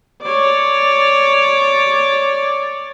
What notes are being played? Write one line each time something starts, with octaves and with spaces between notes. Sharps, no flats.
C#5 D5